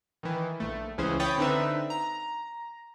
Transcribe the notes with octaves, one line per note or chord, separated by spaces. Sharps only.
D#3 E3
A#1 A3
C#2 E3 C#4 G#4 C5
C#5 G5 B5 D#6 A6
D3 C4 D4 D#4 B4 E5
A#5